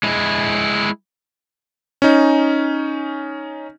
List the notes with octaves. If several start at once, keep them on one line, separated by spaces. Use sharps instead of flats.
G#3 E4
C#4 D#4